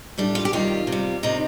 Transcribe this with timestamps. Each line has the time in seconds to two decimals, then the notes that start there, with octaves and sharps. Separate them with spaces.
0.18 A2 G3 D4
0.35 F4
0.45 G4
0.53 C3 D#3 G3 F4
0.87 C3
0.92 G3
1.23 C3 D#3 G3 D#4